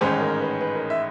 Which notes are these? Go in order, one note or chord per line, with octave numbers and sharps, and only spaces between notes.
A1 G#2 D#3 G#3 C#4 C5
A#4
B4
B4
A#4
E5